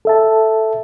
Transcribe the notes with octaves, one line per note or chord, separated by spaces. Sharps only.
A4 E5 A5